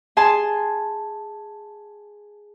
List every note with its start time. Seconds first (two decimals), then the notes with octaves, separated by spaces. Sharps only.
0.17 G#4 G#5 A5 C6